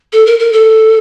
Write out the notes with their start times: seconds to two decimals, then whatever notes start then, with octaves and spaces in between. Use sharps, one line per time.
0.13 A4
0.26 A#4
0.39 A#4
0.52 A4